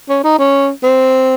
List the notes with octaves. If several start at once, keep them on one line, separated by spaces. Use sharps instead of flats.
C#4
D#4
C#4
C4